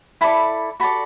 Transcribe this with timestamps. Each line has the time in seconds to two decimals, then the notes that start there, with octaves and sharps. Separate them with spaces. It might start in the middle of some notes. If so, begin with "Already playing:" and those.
0.21 E4 A4 D5 B5
0.80 F#4 A4 D5 B5